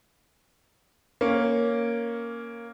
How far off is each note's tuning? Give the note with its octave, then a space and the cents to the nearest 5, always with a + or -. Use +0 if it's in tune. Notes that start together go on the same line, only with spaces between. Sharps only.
A#3 +0 C#4 +0 C#5 +0